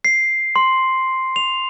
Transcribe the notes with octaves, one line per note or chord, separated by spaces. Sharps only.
C7
C6
F7